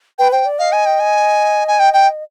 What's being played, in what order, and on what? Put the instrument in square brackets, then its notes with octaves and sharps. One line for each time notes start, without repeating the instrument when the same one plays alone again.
[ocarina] B4 [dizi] G5
[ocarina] C5 [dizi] G5
[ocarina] D5
[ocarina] D#5 [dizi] F5
[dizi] G#5
G5
G#5
G#5
G5
G5